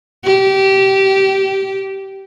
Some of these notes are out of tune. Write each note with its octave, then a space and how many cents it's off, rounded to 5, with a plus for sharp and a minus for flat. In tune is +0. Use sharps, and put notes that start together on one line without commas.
G4 -20